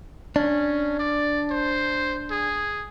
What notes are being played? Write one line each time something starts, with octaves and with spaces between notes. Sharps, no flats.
C#4 D4
D5
C5
G#4